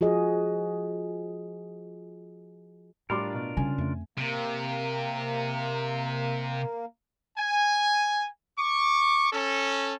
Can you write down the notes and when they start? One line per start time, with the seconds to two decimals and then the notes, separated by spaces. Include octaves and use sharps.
0.01 F3 F#4 G#4 D#5
3.10 A2 G3 D4 F4 A#4 C6 D6
3.34 B2
3.57 C#3 G3 G#5
3.78 F2 A3
4.18 C3 A#3
7.37 G#5
8.58 C#6 D6
9.32 C#4 A4